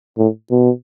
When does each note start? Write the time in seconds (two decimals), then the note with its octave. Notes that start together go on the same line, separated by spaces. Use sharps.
0.18 A2
0.51 B2